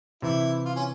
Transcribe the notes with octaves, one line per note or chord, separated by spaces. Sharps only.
C3 E3 E4
F4
C#4